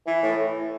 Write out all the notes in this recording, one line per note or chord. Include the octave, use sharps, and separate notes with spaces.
E3
A2